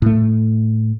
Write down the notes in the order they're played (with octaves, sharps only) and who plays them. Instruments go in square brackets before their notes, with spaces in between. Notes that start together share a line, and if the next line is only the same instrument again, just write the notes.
[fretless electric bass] A2 A3